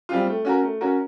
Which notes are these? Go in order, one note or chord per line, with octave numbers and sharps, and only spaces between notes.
G3 C4 F4
A3
C#4 F#4 A#4
A3
C#4 F#4 A#4